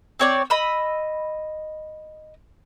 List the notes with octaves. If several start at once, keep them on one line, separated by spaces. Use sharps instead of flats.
C4 C#5 D5
D#5 B5 E6